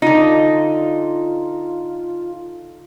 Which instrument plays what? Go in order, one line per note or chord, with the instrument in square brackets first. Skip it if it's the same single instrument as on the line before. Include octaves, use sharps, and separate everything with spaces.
[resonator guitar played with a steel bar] D3 D#4 [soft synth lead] F4